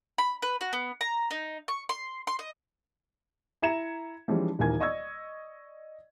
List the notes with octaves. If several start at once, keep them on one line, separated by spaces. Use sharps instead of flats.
B5
B4
F#4
B3
A#5
D#4
C#6
C6
C6
D#5
E4 E5 A#5 G#6 C#7 E7
E3 F3 G3 G#3 C#4 D#4
D#1 D#3 E3 A#4 G#5 G#6
D5 D#5 C#6 E6 G#6